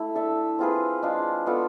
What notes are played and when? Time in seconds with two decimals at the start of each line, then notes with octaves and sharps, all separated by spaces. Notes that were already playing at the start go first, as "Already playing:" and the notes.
Already playing: A3 E4
0.15 D4 A4 E5
0.59 C4 F4 G#4 B4
1.02 G#3 D4 F4
1.46 B3 F4 A4 D5